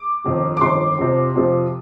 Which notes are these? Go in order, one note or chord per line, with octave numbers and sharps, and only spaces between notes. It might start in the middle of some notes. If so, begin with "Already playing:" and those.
Already playing: D6
G1 F2 D#3
D6
G1 F2 D#3 C6
F2 C3 F3
F2 C3 F3